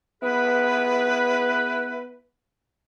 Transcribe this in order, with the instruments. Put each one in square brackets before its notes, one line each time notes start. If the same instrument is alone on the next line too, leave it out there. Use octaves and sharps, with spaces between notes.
[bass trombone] B3 [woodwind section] E4 G#4 B4